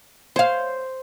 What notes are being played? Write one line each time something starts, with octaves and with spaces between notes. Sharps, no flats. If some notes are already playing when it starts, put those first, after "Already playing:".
C5 C#5 F5